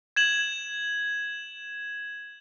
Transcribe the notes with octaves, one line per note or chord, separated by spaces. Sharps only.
G#6 E7 F#7